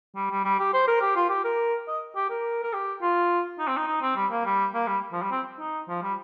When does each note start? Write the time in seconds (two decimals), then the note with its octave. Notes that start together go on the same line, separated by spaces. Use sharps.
0.16 G3
0.30 G3
0.45 G3
0.59 G4
0.74 C5
0.88 A#4
1.01 G4
1.16 F4
1.30 G4
1.44 A#4
1.88 D#5
2.16 G4
2.30 A#4
2.63 A#4
2.74 G4
3.02 F4
3.59 D#4
3.68 C4
3.77 D#4
3.88 D#4
4.02 C4
4.16 G3
4.31 A#3
4.45 G3
4.74 A#3
4.87 G3
5.12 F3
5.22 G3
5.31 C4
5.59 D#4
5.89 F3
6.03 G3